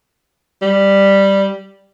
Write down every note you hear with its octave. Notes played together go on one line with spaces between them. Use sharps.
G3